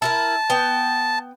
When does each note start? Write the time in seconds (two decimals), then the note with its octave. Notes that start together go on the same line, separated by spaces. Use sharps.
0.02 E4 F4 A#4 A5
0.50 B3 G5